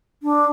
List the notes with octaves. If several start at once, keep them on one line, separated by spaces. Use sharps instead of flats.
D4